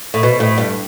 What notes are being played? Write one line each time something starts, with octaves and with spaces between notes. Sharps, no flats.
A2
B2
A2
G2